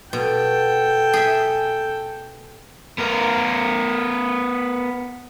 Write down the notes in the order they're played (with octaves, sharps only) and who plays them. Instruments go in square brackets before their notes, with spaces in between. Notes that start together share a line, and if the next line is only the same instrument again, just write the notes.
[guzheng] B2 [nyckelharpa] A4 G5
[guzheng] G#4 E5
[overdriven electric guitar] B3 A#4